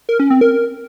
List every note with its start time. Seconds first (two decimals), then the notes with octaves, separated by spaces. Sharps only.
0.09 A#4
0.20 C#4
0.30 C4
0.41 A#4